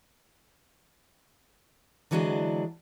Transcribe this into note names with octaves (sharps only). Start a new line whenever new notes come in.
D3 E3 F#3 G#3 C4 D4